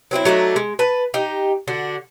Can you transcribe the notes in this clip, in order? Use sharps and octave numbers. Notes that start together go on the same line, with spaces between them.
F#3 C4 D#4 E4
F#3 A3 D4 D#4
G#3
B4 A5
D#4 G4
D3 D4 F#4